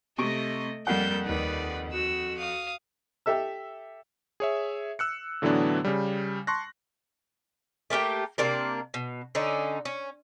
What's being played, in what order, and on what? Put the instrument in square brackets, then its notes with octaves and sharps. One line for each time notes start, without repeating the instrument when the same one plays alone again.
[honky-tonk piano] C3 C#6 D7 [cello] A3 [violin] D#5 A#6
[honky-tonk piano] F2 F#5 [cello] G3 A#3 [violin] A4 G6
[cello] D#2 [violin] B4 D5
[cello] F#4 [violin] E6
[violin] F5 D#6
[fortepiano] G4 A4 E5 E6
[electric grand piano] G#4 C#5 E5
E6 F#6 C#7
A2 D3 E3 F#3 B3 D4
C#3 G3
A5 C6 C#6 F#6 A#6
[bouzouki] A3 A#3 G4 G5
C3 A#3 D4 A#4
B2
D3 C#4 D#4
C#4